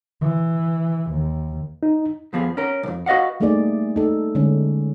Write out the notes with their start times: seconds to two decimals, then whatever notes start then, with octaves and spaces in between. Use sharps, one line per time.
0.21 E3
1.10 D#2
1.83 D#4
2.33 F2 F3 B3 G#4
2.57 C#4 A#4
2.83 B1 F2
3.06 F#4 B4 D#5 F5 F#5
3.40 G3 A3 A#3 D#4 G#4 D5
3.96 D#4 A4
4.35 D3 G#3 C#4